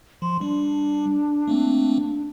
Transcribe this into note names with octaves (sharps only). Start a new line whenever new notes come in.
F3 C6
G3 D4
A3 A#3 C4